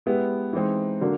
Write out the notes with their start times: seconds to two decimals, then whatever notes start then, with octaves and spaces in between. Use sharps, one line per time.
0.06 G#3 B3 E4 G4 B4
0.53 E3 G#3 C4 D#4
1.01 D3 F#3 A#3